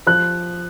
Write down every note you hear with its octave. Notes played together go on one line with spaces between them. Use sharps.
F3 F#6